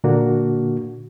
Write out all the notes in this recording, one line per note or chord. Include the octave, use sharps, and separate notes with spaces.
A#2 D3 A#3 D4 F#4